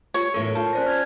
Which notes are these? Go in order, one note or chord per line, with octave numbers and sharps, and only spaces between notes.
F4 C#5
E2 A2 F#3 A4 A#4 C#6 D7
F4 A5 F6 G6
C#4 C5 D5 A#6
F6 G#6